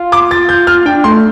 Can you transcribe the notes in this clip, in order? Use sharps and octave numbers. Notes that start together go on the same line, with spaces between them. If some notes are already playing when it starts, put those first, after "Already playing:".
Already playing: F4
D6
A6
G6
F6
D4 G5
A3 C6